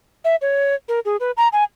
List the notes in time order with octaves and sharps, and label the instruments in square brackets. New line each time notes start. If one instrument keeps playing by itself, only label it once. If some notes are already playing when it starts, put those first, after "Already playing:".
[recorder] E5
C#5
A#4
G#4
B4
A#5
G#5